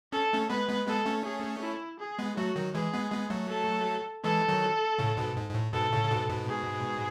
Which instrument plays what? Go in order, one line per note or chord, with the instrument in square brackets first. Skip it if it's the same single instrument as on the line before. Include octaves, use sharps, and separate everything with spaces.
[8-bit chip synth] C#4 [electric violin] A4
[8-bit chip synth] A3 C#4
[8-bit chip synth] G#3 B3 [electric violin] B4
[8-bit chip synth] G#3 B3
[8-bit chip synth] G#3 B3 [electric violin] A4
[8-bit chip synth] A3 C#4
[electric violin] G#4
E4
G#4
[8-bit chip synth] G#3 B3
[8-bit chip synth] F#3 A3 [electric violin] F#4
[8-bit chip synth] D#3 F#3
[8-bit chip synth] E3 G#3 [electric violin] G#4
[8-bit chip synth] G#3 B3
G#3 B3
F#3 A3
[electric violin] A4
[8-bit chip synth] E3 G#3 [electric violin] A4
[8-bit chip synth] D#3 F#3
A2 C#3
G#2 B2
G#2
G#2
A2
[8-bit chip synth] G#2 B2 [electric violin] A4
[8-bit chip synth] A2 C#3
C#3
G#2 B2
G#2 B2
[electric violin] G#4